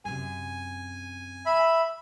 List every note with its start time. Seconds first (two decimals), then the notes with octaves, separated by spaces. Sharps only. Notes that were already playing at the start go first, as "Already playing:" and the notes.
0.05 F#2 C3 G#5
1.46 E5 B5